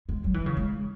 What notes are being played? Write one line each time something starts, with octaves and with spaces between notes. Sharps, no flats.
G#3
F#3
E3
C#3
G#3